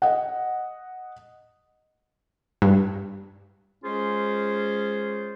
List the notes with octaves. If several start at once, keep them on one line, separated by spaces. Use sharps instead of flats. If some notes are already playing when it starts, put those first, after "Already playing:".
D#5 F#5
G2
G#3 C#4 F4 G#4 C5